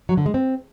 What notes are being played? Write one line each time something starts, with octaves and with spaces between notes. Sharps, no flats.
F#3
D3
G#3
C4